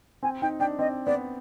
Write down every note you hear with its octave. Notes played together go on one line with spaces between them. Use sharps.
C4 G#5
D#4 G5
D4 G5
C4 D#5
B3 D5